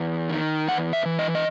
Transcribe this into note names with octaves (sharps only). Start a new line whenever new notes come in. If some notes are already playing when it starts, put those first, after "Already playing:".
Already playing: E2
D#3
E2 F#5
E5
E3
D#5
D#5